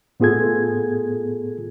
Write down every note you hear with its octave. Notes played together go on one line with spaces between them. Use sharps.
A2 B3 F4 G#4 A4 G#6